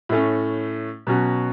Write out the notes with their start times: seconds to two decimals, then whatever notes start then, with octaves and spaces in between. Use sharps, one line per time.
0.09 A2 A3 C#4
1.07 B2 F#3 C#4 F#4